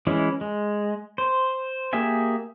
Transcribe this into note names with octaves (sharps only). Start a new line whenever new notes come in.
E3 G#3 C#4 E4
G#3
C5
A#3 G4 G#4 E5 G#5